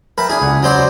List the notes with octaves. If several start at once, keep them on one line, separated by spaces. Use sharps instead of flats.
A#4 B4 E5 G5 A5
D4 E4 G#4
C#2 F#5
F#3 C5 D5